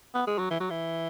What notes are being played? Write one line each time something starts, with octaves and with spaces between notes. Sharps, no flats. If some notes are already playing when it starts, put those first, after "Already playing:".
B3
G#3
F#3
E3
F#3
E3